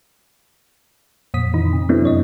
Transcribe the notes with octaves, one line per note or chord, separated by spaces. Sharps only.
F2 A#2 D#6 B6
D#3 E3 D#4
C3
F#3 A3 B3 C4 D4 E4
F#2 C#5 D#5